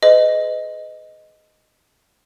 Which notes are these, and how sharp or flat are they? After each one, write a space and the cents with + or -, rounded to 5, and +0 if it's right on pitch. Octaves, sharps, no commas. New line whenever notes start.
G#4 +45 B4 +40 D#5 +0